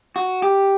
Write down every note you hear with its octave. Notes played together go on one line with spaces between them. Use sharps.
F#4
G4